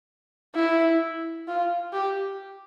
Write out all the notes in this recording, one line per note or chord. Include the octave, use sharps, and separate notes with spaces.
E4
F4
G4